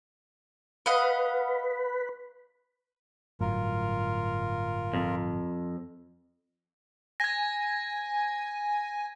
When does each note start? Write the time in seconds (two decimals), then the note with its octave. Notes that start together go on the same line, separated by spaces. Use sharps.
0.86 B4 D#5 F5 F#5
3.41 G1 A2 F#3 F4 A#4
4.94 F2
7.20 G#5 G#6 A#6